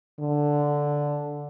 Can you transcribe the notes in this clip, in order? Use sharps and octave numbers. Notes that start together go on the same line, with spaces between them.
D3